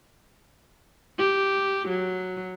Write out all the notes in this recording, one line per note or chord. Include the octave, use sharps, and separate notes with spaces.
G4
F#3